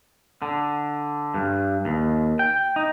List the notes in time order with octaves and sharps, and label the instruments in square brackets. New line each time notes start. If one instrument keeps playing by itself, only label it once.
[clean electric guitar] D3
G2
D#2
G5
D#4